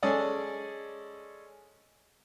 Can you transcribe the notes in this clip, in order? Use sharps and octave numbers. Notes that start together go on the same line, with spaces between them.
G#3 C#4 G#4 A4 D5